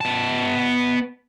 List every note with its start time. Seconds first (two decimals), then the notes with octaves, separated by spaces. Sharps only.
0.01 B3 A5